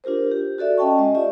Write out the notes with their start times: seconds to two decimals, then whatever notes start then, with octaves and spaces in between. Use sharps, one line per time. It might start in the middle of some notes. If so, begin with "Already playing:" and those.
0.04 D4 F4 G4 A#4 C5
0.32 G4
0.58 F#4 A4 D5 E5
0.78 C#4 D#5 G5 A5 C#6
0.98 G#3 D#5
1.15 F4 G4 D5 E5